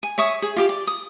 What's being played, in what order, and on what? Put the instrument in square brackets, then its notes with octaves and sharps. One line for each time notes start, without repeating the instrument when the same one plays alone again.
[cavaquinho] G#5
C#5 E5 C#6 D#6
G#4
F4 G4 D6
D5
D#6